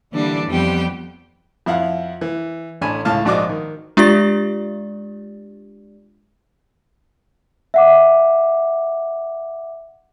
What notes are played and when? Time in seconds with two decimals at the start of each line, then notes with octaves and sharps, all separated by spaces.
0.14 D3 E3 G3 A#3 D4
0.47 F2 G3 B3 G4 G5
1.66 F2 E4 F5 F#5
2.21 E3
2.81 A1 D4 G#5 B5
3.05 C#2 A2 F5 A5 F6
3.25 A#1 G#2 F#4 D5 D#5 D6
3.49 D#3
3.97 G#3 D4 F4 G4 D5 A6
7.74 E5 F#5 D6